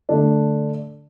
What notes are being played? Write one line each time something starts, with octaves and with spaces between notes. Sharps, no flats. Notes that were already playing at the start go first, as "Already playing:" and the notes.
D3 A3 D4 A4